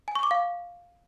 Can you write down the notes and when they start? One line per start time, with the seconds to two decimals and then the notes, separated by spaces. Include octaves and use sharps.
0.08 G#5
0.15 C#6
0.23 D6
0.31 F5